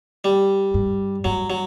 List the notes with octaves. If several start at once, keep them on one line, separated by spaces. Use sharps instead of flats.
G3
G2
G2 F#3
F#3